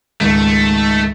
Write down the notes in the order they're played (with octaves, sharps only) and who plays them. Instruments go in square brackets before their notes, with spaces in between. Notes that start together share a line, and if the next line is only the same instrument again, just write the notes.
[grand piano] C#2 G#2 D#3 [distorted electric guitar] A3